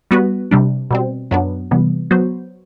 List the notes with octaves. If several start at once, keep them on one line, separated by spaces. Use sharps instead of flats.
G3 B3 F#4 B4
C3 G3 D4
B2 G3 C4
F#2 F#3 B3 D4
C3 E3 G3 B3
F#3 B3 F#4 C5